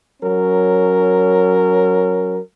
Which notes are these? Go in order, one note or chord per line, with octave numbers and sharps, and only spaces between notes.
F#3 C#4 A#4